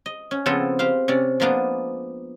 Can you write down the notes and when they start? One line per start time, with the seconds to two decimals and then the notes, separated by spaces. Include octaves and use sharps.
0.06 D#5
0.31 C#4
0.46 C#3 F3 B3 C4 A4
0.79 G4 C5 F5
1.08 C3 C#4 D5
1.40 F3 G#3 A#3 B3 D4